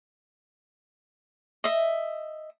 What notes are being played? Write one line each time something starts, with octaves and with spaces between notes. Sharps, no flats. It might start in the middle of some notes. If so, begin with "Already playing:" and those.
D#5 E5